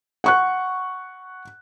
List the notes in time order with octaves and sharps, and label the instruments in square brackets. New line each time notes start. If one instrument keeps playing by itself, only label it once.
[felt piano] F#5 C#6 F#6